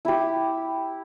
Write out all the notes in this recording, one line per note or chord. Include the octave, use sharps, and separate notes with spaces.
E4 G4